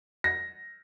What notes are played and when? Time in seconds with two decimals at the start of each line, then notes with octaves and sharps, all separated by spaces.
0.24 A#6